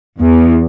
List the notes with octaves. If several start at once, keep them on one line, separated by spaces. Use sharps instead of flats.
E2